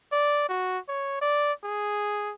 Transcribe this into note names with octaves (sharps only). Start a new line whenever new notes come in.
D5
F#4
C#5
D5
G#4